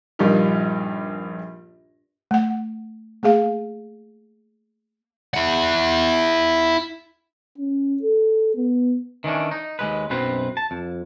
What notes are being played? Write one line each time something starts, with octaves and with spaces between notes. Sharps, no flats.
A#1 G2 D#4 F4 G4 A#4
A3 F#5
A3 A#3 G#4 F5
E4 F#5
C#4
A4
B3
D#3 E3 C#4 D4
D#4
D#2 G#3 B4
B1 F#2 C4 B4
A5
F2